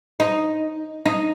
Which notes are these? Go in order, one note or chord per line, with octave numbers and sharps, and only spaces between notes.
D#4
D#4